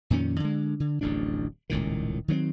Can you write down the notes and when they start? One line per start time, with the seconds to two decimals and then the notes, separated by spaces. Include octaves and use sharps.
0.10 F2 A#2 D#3 C#4
0.40 D3 G#3
0.80 D3
1.01 D1 A1 F2 D4
1.70 D#1 C#2 A2 D#3
2.28 D#3 F#3 B3 C4